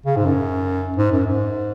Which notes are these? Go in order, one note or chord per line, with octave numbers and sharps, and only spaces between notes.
C#3
G#2
F#2
G#2
F#2
G#2